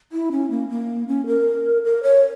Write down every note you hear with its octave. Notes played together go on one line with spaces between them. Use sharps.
E4
C#4
A#3
A#3
C#4
A#4
A#4
C#5